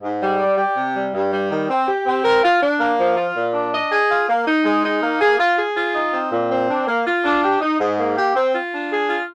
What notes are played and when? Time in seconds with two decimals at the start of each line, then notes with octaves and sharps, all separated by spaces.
0.02 G#2
0.21 G3
0.39 D5
0.57 G4
0.75 C3
0.95 G3
1.13 G2
1.31 G3
1.50 D#3
1.69 C4
1.87 G4
2.06 C4
2.24 A#4
2.43 F4
2.61 D4
2.79 A#3
2.98 F3
3.16 F4
3.35 A#2
3.53 D4
3.73 D#5
3.91 G#4
4.10 F4
4.28 A#3
4.46 D#4
4.65 G#3
4.84 D#4
5.02 A#3
5.20 G#4
5.38 F4
5.57 G#4
5.76 F4
5.94 D#4
6.12 C4
6.31 A#2
6.50 C4
6.69 D4
6.87 A#3
7.06 F4
7.24 D4
7.43 G4
7.61 D#4
7.80 G#2
7.98 A#3
8.17 G4
8.35 C4
8.53 F4
8.73 D4
8.90 G#4
9.09 F4